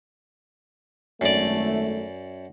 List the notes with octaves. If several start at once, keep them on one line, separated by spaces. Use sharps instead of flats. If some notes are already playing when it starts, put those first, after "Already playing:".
G#1 F#2 A3 D5